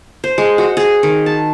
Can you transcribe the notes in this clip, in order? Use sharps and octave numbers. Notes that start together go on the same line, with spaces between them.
C5
G#3
F#4
G#4
D#3
A5